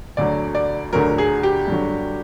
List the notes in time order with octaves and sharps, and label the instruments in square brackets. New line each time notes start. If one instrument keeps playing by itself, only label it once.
[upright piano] D2 D3 F#3 [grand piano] D5
[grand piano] D5
[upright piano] D2 D3 F#3 [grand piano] A#4
[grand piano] G#4
G4
[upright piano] G2 D3 F#3